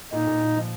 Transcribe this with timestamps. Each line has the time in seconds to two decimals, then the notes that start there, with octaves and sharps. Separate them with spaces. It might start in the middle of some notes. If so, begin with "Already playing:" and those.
0.12 A#2 D#4
0.27 A#2
0.41 A#2
0.56 F3